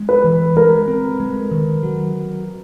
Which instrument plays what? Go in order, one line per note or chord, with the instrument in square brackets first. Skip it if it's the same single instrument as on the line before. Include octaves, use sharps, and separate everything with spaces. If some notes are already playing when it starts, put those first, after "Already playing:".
Already playing: [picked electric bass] G#3
[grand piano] B4
[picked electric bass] E3
[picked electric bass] G#3 [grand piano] A#4
[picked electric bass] C4
G#3
D#3
F#3